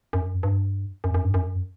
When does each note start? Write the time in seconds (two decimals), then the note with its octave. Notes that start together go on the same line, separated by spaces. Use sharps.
0.13 F#2
0.43 G2
1.04 F#2
1.14 F#2
1.24 G2
1.34 F#2